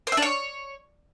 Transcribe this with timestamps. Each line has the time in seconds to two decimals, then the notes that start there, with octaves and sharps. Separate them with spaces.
0.07 C5
0.12 E5
0.17 D4
0.22 C#5